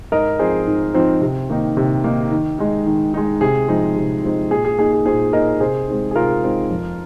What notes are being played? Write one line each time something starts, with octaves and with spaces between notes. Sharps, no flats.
G#2 A#4 D#5
F3 C4 D#4 G#4 C5
G#2
F3 C4 D#4
C3
D#3 A#3 D#4
C3
D#3 A#3 D#4
D#3
G#3 D#4
D#3
G#3 D#4
C3 G#4
F3 G#3 C4 D#4
C3
F3 G#3 C4 D#4
A#2 G#4
G#4
A#3 D#4 G#4
G#4
A#2 G#4 C5
A#3 D#4 A#4 D#5
C3 G#4 C5
G#3 C4 D#4
G#4
C3 F4 A#4
G#3 C4 D#4
F2